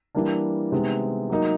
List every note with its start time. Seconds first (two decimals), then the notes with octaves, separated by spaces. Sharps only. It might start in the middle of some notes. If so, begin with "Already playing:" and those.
0.15 E3 G3 A#3 D4
0.72 C3 D#3 G#3 B3
1.30 F#3 A#3 D#4